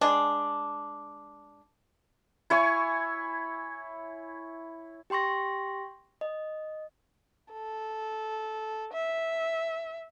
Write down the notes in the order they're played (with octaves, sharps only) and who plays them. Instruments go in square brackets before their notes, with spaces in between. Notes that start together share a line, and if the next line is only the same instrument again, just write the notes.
[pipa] G#3 D4
[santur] E4 C#5 G#5 C#6
[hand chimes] G4 G5 C6 C#6 A#6
D#5
[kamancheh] A4
E5